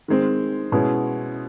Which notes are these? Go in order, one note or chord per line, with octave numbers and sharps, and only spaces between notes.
D#3 G#3 C4
B2 G#3 C#4 E4